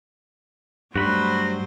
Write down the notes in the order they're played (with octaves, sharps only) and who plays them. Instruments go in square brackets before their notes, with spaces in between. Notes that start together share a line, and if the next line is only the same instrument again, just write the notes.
[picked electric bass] G2 [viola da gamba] F#3 A3 C5 [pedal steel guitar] F#4 B5